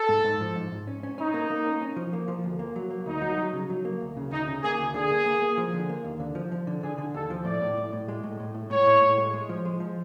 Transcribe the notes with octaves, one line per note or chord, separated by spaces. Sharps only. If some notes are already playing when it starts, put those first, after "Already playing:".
Already playing: A4
G#2
G#2
F3
G#2
G#2
C#4
C#4
C#4 D#4
A#3
A#3
C#4
C#4
F3
A#3
F3
D2
A#3
F#3
A#3
D2 D#4
F#3
F#3
C#3
F#3
A#3
D2
C#3
D2 D#4
C#3
A#3 G#4
D2
D3 G#4
A#3
A#3
A#3
F3
D3
A#3
D#2
D3
F3
F3
D3
D3 G#4
D3
D#2 A4
F3
A2 D5
A2
A2
A2
G#3
A2
A2
A2
A2 C#5
A2
A2
G#3
G#3
F3
G#3
F3